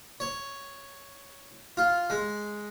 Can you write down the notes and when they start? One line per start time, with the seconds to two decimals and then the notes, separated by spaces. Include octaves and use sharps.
0.20 C#5
1.77 F4
2.10 G#3